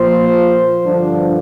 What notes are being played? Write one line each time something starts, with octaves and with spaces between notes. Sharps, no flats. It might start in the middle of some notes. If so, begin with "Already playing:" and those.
Already playing: A#2 F3 C5
G2 D3 F3 D4